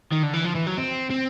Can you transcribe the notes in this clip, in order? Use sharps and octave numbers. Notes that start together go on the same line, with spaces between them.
D#3
D3
E3
F3
E3
F#3
C4
C4